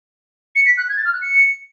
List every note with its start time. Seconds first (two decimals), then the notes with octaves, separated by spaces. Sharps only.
0.56 C#7
0.66 B6
0.78 F#6
0.89 G#6
0.97 A6
1.05 F6
1.13 F#6
1.22 C#7